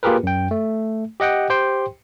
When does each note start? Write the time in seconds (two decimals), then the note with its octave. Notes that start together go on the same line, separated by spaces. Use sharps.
0.03 A#3 F4 G4 G#4 A#4 B4
0.23 F#2 G5
0.51 A3
1.20 G4 D#5 F#5 G5
1.50 G4 C5 G5 C6